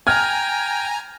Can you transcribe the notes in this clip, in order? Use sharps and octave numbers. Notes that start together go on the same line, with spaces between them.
G5 G#5 A#5 F6 G#6